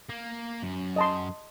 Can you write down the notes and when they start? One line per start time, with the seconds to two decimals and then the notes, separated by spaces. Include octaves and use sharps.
0.09 A#3
0.62 F#2
0.96 D#5 A5 C6